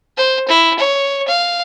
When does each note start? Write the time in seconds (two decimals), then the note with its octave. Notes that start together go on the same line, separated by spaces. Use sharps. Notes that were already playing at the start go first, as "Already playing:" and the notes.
0.17 C5
0.48 E4
0.79 C#5
1.28 F5